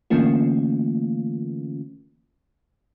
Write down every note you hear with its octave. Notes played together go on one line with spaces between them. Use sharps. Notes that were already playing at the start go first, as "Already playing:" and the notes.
D3 E3 A3 A#3 C#4 F4